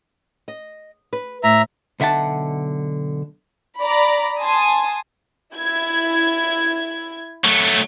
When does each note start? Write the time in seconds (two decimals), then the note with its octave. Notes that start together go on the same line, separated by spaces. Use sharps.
0.48 D#5
1.13 B4
1.43 A2 E5 A#5
2.00 B1 D3 E5 F#5 A5
3.81 D5 A#5 B5
4.40 G#5 A5 C6 D#6
5.55 E4 G#6
7.45 F#3 A3